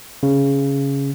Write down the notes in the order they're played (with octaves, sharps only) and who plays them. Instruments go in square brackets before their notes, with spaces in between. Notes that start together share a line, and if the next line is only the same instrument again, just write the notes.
[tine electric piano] C#3